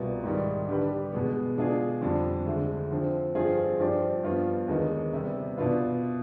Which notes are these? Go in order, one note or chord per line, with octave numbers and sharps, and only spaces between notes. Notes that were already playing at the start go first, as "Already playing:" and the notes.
Already playing: C2 B2 G3 B3 F4
G#2 D#3 G3
D3 G3 D4 G4 B4
B2 G#3 B3
B2 G#3 D4 F4 G#4
F2 D3 G3 D4
D2 D3 G#3
D3 F3 C4
G2 F3 C4 F4 G#4
G2 F3 C4 G4 D5
G2 F3 B3 F4
D#2 D3 G#3 B3 D#4
C3 G3 B3
B2 B3 D4 F4 B4